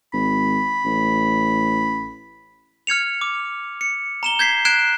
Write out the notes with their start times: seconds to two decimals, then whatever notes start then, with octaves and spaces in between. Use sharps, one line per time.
0.13 G#1 B5
0.85 A1
2.87 F6 G#6 C#7 F7
3.21 D6
3.81 C#7
4.23 A#5 E7 G7
4.39 G6 G#6 B6 C7
4.65 F#6 G#6 C7 D7 E7